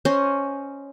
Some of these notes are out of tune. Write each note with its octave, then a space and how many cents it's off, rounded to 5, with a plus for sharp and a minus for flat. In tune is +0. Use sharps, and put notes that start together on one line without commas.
C#4 +0 C5 +0 D#5 +0